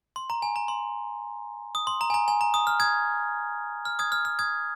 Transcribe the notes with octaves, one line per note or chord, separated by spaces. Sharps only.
C6
A#5
G#5
A#5
C6
D#6
C6
A#5
G#5
A#5
G#5
A#5
D#6
F6
D#6 G#6
F6
D#6 G#6
F6
F6
D#6 G#6